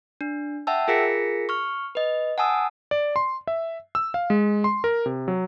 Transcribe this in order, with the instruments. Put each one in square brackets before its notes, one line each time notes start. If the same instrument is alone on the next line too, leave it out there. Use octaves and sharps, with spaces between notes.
[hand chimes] D4
E5 F#5 G5 A5 E6
F4 G#4 A#4 A#6 B6 C#7
C#6 F6
B4 D#5
F#5 G#5 A5 D#6 E6
[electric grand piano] D5
C6
E5
E6
F5
G#3
C6
A#4
C3
F#3